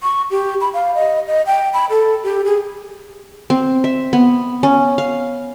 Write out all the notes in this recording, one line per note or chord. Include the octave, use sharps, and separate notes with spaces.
C#6
G4
B5
F5
D#5
D#5
G5
B5
A4
G4
G#4
C4
E5
B3
C#4
F5